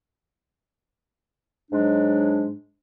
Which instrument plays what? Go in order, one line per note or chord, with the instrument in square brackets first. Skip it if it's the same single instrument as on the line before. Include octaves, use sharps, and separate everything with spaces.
[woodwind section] G#2 F#3 G#3 D4